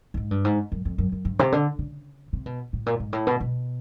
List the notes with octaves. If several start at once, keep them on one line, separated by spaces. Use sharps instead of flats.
G2
G#2
G2
G#2
F#2
F2
F#2
F#2
G2
C3
D3
C#3
C3
B2
A2
A#2
G#2
A2
B2
B2